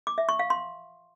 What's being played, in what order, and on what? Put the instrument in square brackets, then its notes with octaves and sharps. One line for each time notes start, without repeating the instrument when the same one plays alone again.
[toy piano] D6
E5
C#6
F5
C6